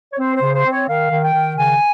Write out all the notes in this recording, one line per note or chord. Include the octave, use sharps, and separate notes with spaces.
C#5
C4 C5
C5
C#3
C5
C4
C#5
D#3 F5
D#3
G5
D#3
C#3 G#5